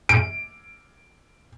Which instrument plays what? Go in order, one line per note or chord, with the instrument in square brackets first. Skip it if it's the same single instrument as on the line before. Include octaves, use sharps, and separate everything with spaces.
[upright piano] D7